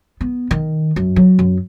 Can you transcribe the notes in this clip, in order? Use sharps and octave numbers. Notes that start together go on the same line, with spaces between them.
B3
D#3
F#2
F#3
F#2